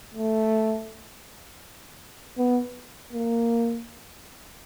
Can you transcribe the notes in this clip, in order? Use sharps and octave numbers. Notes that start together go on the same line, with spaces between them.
A3
B3
A#3